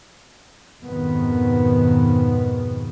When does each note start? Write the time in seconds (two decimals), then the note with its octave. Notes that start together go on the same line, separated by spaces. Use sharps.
0.82 F2 G#2 B2 D#3 B3